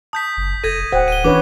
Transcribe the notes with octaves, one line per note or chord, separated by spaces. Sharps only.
A5 D#6 G6 B6
F#1
F1 A4 G#6 A#6 D#7
D1 C5 F#5 G5
D#7 G7
E3 C#4 D4 B4 C#5 D6